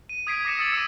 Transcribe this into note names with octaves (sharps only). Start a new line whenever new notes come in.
D#7
D#6 G#6 B6 C7 D7
D6 D#6 A#6 C7 C#7 E7
D#6 E6 A6 C#7 F#7
D6 E6 D#7